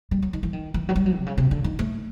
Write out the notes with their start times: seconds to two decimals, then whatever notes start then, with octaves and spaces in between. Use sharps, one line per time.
0.11 G3
0.22 F#3
0.33 D#3
0.43 E3
0.53 D#3
0.74 E3
0.89 F#3
0.96 G3
1.06 F#3
1.16 C3
1.27 C#3
1.38 C3
1.51 D3
1.64 D#3
1.79 A3